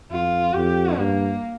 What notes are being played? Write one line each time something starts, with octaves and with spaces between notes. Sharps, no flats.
F2 F4
F2 G4
G2 A#3